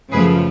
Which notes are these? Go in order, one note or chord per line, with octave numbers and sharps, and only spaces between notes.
F#2 C#3 F3 A3 G#4 B4